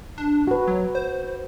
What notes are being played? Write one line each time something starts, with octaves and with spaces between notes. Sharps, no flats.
D4
F#4 B4
F#3
C5